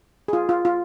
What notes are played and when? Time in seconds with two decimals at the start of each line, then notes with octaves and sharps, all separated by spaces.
0.28 G#4
0.33 F4
0.49 F4
0.65 F4